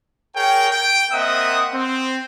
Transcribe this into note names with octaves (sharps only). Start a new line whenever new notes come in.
G#4 A#4 C#5 G5
G5
A#3 C4 D#5 E5 F#5 D#6
C4